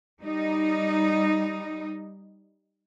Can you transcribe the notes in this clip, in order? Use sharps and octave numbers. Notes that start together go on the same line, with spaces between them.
G3 D#4